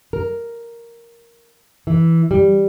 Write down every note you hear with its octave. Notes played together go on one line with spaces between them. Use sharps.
A#4
E3
G3